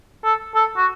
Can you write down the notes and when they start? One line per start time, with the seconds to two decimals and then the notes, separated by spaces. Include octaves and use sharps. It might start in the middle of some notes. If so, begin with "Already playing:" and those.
0.24 A4
0.55 A4
0.77 F#4